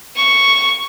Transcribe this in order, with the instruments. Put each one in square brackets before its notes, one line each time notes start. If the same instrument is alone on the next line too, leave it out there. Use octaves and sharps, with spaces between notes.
[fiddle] C#6